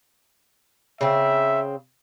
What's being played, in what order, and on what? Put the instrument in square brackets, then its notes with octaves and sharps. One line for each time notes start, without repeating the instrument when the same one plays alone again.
[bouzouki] C#3 C4 [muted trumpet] E5